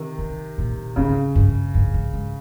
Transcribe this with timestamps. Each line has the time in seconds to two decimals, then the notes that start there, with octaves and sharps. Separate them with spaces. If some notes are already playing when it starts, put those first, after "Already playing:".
Already playing: C3 D#3
0.18 C#3
0.58 A#2
0.96 G#2 C#3
1.35 G2
1.74 G2
1.94 G#2
2.13 G#2